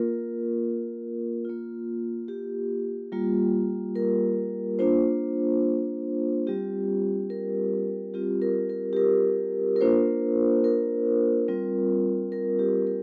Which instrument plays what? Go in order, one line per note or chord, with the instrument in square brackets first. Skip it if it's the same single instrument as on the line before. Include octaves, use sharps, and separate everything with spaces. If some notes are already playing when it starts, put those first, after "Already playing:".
Already playing: [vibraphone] A#3 F4 A#4
A#3 F4
G4
G3 A#3 F4
A#4
A#3 D4 F4 C5
G3 C4 F4 G4
A#4
G3 C4 F4 G4
A#4
A#4
G4
A#4
A#4
A#3 D4 F4 C5
A#4
G3 C4 F4
A#4
G4
A#4